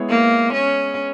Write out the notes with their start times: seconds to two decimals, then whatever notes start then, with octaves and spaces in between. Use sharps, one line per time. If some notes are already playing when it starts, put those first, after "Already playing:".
Already playing: G#3 B3 E4 G#4 C#5
0.09 A#3
0.53 C#4